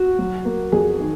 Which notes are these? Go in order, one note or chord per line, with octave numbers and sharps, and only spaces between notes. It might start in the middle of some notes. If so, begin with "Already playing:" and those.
Already playing: F#4
F#3
A#3
F2 G#4
D#3